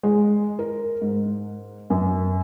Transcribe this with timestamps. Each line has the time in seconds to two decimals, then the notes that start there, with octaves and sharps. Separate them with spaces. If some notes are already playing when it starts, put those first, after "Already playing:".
0.03 G#3
0.59 A#4
1.02 G#2
1.90 F#2